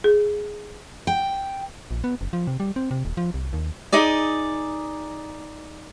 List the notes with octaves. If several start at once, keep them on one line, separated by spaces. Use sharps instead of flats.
G#4
G5
A#1
B3
F#1
F3
C3
G3
C4
C3
D#1
F3
C2
D#2
D#4 G#4 D5